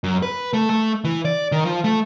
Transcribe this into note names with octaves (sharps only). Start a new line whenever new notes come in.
F#2
B4
A3
A3
E3
D5
D#3
F3
A3